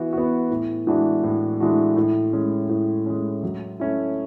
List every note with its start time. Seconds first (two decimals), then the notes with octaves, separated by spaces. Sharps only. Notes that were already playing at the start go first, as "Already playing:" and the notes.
Already playing: E3 B3 F#4
0.13 B3 F#4
0.51 A2
0.87 E3 G#3 D4 F#4
1.23 A2
1.60 E3 G#3 D4 F#4
1.96 A2
2.33 G#3 C#4
2.69 A2
3.06 G#3 C#4
3.43 F#3
3.80 A3 C#4 E4